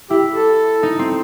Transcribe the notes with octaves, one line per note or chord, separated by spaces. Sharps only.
E4 G4
A4
D#4
C4